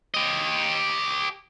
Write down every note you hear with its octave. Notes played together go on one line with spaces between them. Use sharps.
G4 D#5